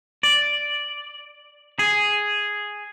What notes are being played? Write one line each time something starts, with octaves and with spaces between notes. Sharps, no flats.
D5
G#4